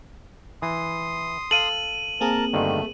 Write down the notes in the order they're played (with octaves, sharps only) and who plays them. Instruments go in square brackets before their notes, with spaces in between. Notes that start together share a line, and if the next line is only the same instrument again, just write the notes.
[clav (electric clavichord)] E3 [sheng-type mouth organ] C6 D#6
[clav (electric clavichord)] A4 F5 [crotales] D#7 F#7
[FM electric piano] A#3 C4 G#4 [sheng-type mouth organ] A#4 A5
[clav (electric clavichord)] G2 D3 D#3 [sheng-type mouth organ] A3